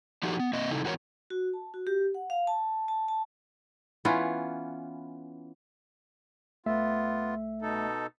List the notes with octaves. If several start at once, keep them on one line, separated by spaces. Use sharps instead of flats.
F3 D4 D#4 F#4 G4 A4
B3
A#3 C4 D#5
C#3 D#4 E4 A4
E2 E3 F#4 A#4 C#5
F#4
A5
F#4
G4
F#5
F5
A5
A5
A5
E3 B3 C#4 F4
C2 A3 B3 F4 E5
B2 D#4 A4